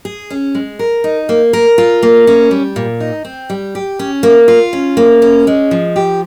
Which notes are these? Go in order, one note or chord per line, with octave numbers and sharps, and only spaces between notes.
G#4
C#4
G#3
A#4
D#4
A#3
A#4
F4
A#3
C#4
G3
A#2
D#4
C4
G3
G4
C#4
A#3
F4
C#4
A#3
C#4
G#3
F3
G4